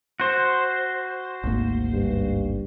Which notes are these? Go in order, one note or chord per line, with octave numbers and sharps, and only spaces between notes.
F#4 C5
G#1 D2 A#3
G2